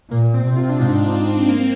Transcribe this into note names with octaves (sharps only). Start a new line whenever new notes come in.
A#2 A#3
C4
C3
F4
D4
G#2 D#4
D4
D4
C4
A#3
C4